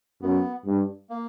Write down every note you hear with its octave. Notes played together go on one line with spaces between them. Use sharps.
F#2 B3
G2
A#3